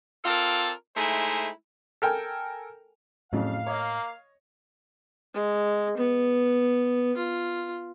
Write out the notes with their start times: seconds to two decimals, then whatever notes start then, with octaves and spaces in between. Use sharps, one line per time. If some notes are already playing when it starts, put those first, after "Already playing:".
0.24 C4 F4 A4 A#4 D5 A5
0.96 G#3 A3 D#4 E4 C5 G#5
2.02 A4 A#4 G5 G#5
3.33 F2 A2 C#3 F#3 F5
3.67 A#3 C#5 D#5
5.34 G#3
5.97 B3
7.17 F4